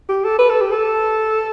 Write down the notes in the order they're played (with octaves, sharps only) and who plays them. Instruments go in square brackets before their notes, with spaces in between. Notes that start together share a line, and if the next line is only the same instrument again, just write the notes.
[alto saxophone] G4
A4
B4
A4
G4
A4